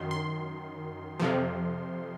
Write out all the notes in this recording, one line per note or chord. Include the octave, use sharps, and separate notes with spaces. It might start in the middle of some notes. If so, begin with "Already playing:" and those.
Already playing: F#2 D#3 C6
C6
F2 C3 F3